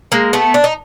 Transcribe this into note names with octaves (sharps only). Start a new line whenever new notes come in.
G#3 A#3
A3 B3
D4
D#4